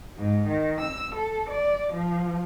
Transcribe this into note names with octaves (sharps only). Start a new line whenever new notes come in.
G#2
D#3
E6
A4
D5
F3